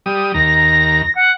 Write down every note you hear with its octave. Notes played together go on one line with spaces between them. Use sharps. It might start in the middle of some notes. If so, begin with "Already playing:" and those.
G3 D#6
D#2 A#5 A#6
F#5